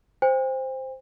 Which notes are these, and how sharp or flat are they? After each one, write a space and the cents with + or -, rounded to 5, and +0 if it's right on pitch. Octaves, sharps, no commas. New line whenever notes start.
C5 +0 G5 +40